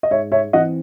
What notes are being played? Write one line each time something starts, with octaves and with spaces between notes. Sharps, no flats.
D#5
G#2 C#5 E5
C#5 E5
E3 C4 D#5 F#5